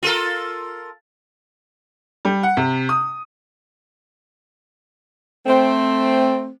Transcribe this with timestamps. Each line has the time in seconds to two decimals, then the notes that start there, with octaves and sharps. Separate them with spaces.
0.03 F4 A4 A#4
2.25 G3
2.43 F#5
2.57 C3
2.89 D#6
5.46 A3 C4